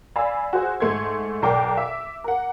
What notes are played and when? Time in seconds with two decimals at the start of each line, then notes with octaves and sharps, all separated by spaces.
0.16 D5 F5 G#5 B5 E6
0.53 F#4 G#4 C5
0.80 G#2 A3 C6 G#6
1.42 B1 A#4 D5 G5 D6
1.77 E5
2.24 A#4 F#5